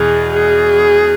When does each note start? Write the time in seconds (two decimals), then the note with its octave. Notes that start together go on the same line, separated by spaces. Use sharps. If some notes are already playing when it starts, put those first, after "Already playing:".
Already playing: E2 B2 G#4
0.34 G#4